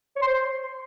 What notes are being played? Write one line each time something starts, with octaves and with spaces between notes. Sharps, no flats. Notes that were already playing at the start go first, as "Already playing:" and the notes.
C#5
C6
C5